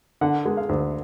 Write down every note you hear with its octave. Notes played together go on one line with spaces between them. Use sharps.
D3 F#5
G#3
F5
D2